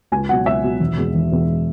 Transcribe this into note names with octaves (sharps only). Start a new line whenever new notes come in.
C#2 G#5
B2 F#3 F#5
C#2 E5
B2 F#3
E1
E2 B2 G#3
E1
E2 B2 G#3